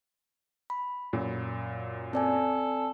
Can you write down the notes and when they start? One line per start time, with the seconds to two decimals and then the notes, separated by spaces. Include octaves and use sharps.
0.70 B5
1.13 F#2 A#2
2.13 C4 A4 D5 G#5